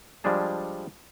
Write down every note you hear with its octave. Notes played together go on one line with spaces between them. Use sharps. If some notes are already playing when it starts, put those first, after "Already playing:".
F3 G3 G#3 D4 G#4 A5